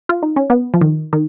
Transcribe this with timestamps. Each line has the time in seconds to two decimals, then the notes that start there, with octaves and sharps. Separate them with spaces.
0.09 F4
0.23 D#4
0.36 C#4
0.50 B3
0.74 F3
0.81 D#3
1.13 D#3